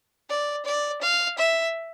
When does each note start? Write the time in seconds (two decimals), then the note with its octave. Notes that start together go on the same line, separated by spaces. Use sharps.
0.30 D5
0.65 D5
1.02 F5
1.38 E5